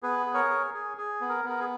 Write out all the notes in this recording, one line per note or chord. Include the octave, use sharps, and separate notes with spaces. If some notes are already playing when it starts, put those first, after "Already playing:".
B3 G#4 B4
G#4
A#4 C#5
G#4
G#4
G#4
B3
A#4
B3 A#4
G#4